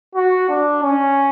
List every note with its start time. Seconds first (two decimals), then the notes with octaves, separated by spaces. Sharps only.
0.15 F#4
0.49 D4
0.83 C#4